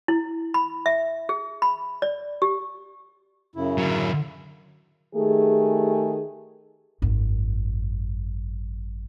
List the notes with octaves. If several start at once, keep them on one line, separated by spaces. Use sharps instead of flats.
E4
B5
E5
G#4
B5
D5
G4
F#2 C#3 E4
D3 F#3
D#3 A3 G4 G#4
G#1 F#2